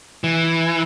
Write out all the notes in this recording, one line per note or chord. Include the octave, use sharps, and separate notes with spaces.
E3